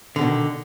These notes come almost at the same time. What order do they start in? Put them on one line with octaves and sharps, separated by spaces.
D3 B2 D#3